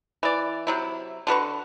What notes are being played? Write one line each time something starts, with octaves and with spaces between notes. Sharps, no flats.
E3 D5
C3 F#3 E4
D3 F#4 B4 C#6